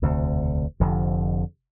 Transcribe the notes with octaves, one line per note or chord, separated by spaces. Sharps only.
E1 D2 C3
F1 F2 D3 F3